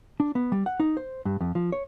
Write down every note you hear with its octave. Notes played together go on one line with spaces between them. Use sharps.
D4
B3
G3
F#5
D#4
C5
G2
F2
F3
C#5